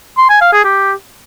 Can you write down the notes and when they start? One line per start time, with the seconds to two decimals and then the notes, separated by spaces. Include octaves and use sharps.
0.18 C6
0.29 G#5
0.41 F5
0.53 G#4
0.64 G4